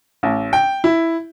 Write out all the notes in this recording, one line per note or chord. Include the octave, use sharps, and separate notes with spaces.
A1
G5
E4